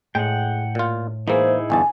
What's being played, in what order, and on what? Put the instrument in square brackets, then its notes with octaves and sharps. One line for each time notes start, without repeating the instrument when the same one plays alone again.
[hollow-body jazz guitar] A2 [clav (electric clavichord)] G#3 [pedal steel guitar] F#5 G5
[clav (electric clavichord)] A#2 F4
[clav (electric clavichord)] E3 G#3 A#3 [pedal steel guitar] D#4 E4 G#4 [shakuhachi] C5
[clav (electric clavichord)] G1 E2 A5 [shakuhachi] G#5